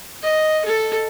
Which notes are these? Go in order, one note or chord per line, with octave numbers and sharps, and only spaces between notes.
D#5
A4